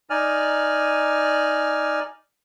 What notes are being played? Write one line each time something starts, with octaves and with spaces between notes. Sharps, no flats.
D#4 D5 G#5 F6